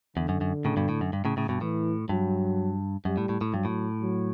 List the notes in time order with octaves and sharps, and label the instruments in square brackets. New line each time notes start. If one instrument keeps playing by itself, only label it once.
[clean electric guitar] E2 [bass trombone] D3
[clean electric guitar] F#2
F#2
A2 C#3
G2 B2
A2
F#2
G2
A2 C#3
A2 C#3
G2 B2
[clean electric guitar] A2 [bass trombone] E3
[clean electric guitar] G2 [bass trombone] F#3
[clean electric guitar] F#2 [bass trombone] G3
[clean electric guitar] A2
A2
A2
[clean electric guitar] G2 [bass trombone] F#3
[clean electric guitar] A2
[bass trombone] F#3